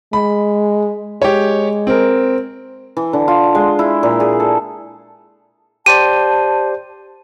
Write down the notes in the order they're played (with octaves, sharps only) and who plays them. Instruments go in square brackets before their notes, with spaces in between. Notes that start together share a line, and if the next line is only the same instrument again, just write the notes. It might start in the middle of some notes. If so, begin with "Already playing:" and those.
[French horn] G#3 [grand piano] B5
[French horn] G#3 [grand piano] G4 C#5
[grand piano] C4 A#4
[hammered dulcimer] E3
D3
F4
G#3
E4
A#2
G#4
A4
[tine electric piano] G4 C5 D5 [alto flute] A5 [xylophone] D#7